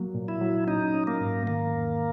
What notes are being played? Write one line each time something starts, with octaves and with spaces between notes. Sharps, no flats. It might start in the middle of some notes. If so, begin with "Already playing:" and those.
Already playing: F#3 A#3
A#2
E4
F#3
C#4 D#4
C#4
A#3
G#2
D#3 A#3
E2